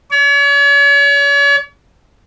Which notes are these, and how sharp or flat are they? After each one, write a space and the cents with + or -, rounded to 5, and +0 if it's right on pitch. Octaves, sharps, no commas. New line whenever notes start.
C#5 +40